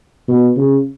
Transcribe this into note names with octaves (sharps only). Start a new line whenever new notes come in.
B2
C#3